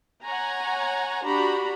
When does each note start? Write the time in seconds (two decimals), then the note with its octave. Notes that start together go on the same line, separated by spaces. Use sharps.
0.23 C#5 F#5 G#5 A#5
1.23 D4 F#4 G4 A#5 B5